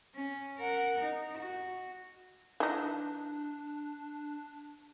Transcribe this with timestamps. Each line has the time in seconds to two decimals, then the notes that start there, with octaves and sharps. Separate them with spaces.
0.15 C#4
0.58 A#4 F#5
0.99 D#4
1.38 F#4
2.60 E3 D4 D#4